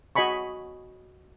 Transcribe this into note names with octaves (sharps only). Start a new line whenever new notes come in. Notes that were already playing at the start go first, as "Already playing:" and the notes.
F#4 D#5 G#5 B5 C#6